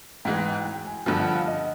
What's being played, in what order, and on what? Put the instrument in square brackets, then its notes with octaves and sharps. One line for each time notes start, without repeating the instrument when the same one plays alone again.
[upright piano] G#2 E3 G#3 [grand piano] G5
[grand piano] G5
G5
G5
G#5
[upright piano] G2 D3 F3 [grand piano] G5
[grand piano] F#5
F5
D#5